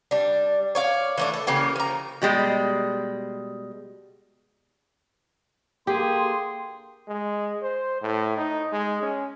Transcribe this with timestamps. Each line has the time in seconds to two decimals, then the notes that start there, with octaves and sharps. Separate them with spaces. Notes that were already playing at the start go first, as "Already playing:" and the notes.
0.11 G3 D4
0.75 C#5 D5 F5
1.18 E3 A3 D4
1.34 A4
1.47 C#3 E3 A#3 G4
1.76 F3 A#5
2.22 B2 G3 G#3
5.87 D3 A#3 G4 G#4 G5 C6
7.08 G#3
7.63 C5
8.02 A2
8.37 D#4
8.72 G#3
9.03 C#4